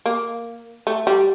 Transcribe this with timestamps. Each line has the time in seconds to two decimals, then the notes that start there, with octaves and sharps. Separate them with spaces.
0.06 A#3
0.87 A3
1.07 G3